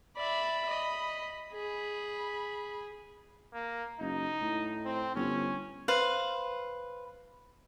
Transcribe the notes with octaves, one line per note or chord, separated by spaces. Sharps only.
D5 E5 B5
D#5
G#4 B5
A#3
F#1 D#4
A2
C4
G1 C#4
B4 C5 F5